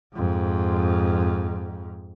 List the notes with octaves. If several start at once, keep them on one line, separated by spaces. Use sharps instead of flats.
F2 G#2